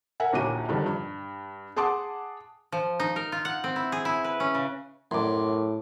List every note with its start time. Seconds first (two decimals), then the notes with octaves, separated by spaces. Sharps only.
0.20 A#4 E5 F#5 G#5
0.33 A#1 D#2 A#2 F#4 D6 D#7
0.69 G2 D3 D#3 F3 G3
0.86 G2
1.76 G#4 F#5 A5 C6 D6 D#6
2.72 F3
3.00 D#4
3.16 A#4
3.32 F4
3.45 F#5
3.64 C4
3.76 E4
3.92 G#4
4.05 E4
4.24 B4
4.40 C#4
4.55 C#3
5.11 F#2 A2 C6 D6